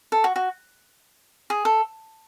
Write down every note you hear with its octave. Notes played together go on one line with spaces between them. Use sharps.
A4
F#4
F#4
G#4
A4